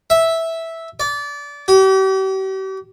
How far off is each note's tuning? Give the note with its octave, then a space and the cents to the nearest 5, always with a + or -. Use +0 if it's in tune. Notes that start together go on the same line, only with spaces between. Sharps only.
E5 -5
D5 -25
G4 -40